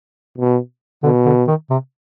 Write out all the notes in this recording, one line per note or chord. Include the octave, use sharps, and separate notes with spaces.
B2
B2 D3
D3
D#3
C3